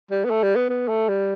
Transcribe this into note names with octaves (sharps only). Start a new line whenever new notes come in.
G3
B3
A3
G3
B3
B3
A3
G3